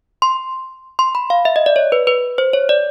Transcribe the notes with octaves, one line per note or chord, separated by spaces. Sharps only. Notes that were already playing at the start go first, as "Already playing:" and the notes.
C6
C6
B5
F5
E5
D#5
D5
C#5
B4
B4
C5
C#5
D5